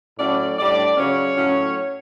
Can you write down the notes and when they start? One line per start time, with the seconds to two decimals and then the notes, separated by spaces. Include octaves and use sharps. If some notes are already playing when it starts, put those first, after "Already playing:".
0.18 A2 F#3 C#4 D5
0.58 A2 G3 D4 D5
0.97 C#3 F#3 C#4 C#5
1.37 A2 F#3 C#4